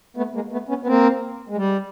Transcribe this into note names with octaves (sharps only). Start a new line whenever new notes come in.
A3 B3
G#3 A#3
A3 B3
B3 C#4
B3
A#3 C4
G#3
G3